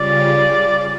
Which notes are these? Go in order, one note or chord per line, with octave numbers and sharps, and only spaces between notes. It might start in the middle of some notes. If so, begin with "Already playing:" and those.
Already playing: C#3 G3 C#4 F4 D5
D5